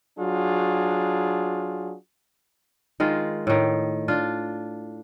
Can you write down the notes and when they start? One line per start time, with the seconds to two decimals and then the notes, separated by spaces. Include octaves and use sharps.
0.19 F#3 D4 F4 F#4 G#4
3.00 D#3 G#3 F4
3.47 A2 D#3
4.08 D4 F4